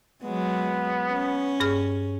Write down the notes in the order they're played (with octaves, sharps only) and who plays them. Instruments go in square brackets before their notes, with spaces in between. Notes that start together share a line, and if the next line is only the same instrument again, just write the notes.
[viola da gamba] F#3 G#3 [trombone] B3
[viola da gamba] C#4
[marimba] G2 G#4 F6